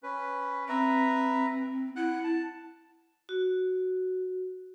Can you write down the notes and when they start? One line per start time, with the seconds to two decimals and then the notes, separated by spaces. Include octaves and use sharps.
0.03 C#4 B4
0.69 C4 B4 E5 A#5
1.96 E4 F#5 F#6
2.24 A5
3.29 F#4